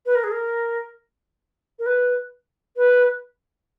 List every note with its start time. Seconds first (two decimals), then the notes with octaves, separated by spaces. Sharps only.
0.06 B4
0.15 A#4
0.24 G#4
0.32 A#4
1.79 A#4
1.86 B4
2.77 B4